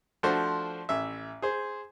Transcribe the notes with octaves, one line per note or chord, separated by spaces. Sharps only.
F3 A3 D4 F#4 C5
A1 E5
G#4 C5